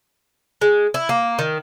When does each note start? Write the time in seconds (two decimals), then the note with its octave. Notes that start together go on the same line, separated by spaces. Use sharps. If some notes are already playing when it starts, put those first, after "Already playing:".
0.61 G#3
0.94 E4
1.09 A#3
1.39 D#3